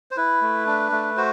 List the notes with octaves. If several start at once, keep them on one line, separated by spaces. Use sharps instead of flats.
C5
E4 B4
A3
D4
A3
F#4 C5